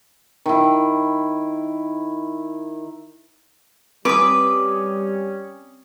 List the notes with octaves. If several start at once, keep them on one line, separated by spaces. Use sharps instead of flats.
D#3 E4
G3 C4 C#4 B4 D6 D#6